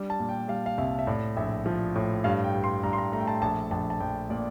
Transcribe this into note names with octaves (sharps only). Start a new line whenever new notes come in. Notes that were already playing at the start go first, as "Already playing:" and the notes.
Already playing: G3 D4
A5
A#2
G5
G3 F5
F5
C2 E5
E5
A2 D5
A#1 E5
F3
A2
G2 F5
G5
G2
C6
G2 A#5
C6
A#5
A3 A#5
G5
A5
A#1 A5
A#1 A5
A5
A#1 G5
A#2 D5